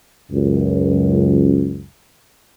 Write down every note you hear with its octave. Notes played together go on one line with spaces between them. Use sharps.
C#2 F#2